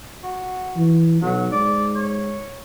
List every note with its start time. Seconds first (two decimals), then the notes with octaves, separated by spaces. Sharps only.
0.23 F#4
0.76 E3
1.22 B1 F#3
1.52 G#2 D5
1.95 C#5